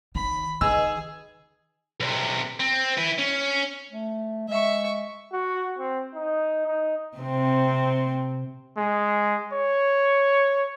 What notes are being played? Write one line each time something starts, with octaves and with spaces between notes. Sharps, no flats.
D#3 B5
D#3 G#4 B4 D#5 E6
B1 C3
C4
E4 B4
C#4
A3
G#3 E5 C#6
F#4
C4
D#4
D#4
C3 C4
G#3
C#5